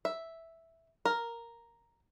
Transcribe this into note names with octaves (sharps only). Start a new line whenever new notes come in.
E5
A#4